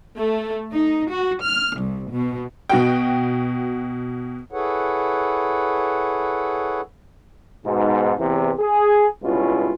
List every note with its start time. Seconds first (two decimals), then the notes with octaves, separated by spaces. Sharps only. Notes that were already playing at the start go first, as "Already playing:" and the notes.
0.18 A3
0.72 D#4
1.09 F#4
1.42 F6
1.79 C2
2.11 B2
2.69 B2 F#4 G5
4.51 E4 G#4 A4 B4 C#5 F#5
7.65 G#2 B2
8.19 E2 C3 E3
8.59 G#4
9.23 C#2 G2 B2 C#4 E4 F4